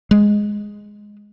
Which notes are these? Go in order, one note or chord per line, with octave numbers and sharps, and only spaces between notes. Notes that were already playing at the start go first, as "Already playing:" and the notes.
G#3